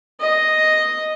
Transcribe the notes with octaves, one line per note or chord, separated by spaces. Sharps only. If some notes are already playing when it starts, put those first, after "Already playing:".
D#5